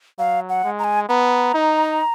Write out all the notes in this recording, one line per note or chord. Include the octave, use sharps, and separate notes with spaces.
F#3 F5
F#5
G#3
A#5
G#5
B3 A#5
D#4